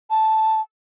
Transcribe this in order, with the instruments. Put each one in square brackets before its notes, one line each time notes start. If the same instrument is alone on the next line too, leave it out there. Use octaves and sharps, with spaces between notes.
[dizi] A5